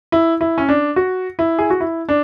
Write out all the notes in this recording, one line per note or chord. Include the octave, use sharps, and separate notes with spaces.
E4
E4
C#4
D4
F#4
E4
G#4
F#4
E4
D4